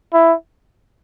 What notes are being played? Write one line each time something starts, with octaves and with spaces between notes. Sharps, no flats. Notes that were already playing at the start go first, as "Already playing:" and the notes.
E4